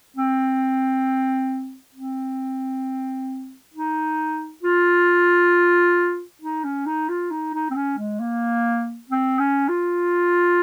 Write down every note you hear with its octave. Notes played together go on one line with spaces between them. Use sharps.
C4
C4
D#4
F4
D#4
C#4
D#4
F4
D#4
D#4
C4
C#4
G#3
A#3
C4
C#4
F4